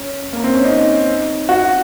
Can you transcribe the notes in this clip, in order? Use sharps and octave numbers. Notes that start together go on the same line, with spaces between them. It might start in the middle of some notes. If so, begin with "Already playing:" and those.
Already playing: C#4
A#3
C4
C#4
D#4
F#4